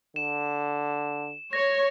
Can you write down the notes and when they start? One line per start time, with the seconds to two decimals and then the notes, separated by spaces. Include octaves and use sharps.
0.16 D3 E7
1.53 C#5 A#6